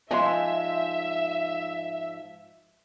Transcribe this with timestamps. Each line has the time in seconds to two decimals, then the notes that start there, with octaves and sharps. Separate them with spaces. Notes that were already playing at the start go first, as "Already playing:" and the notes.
0.11 G#2 F3 D#5 E5 G#5 C6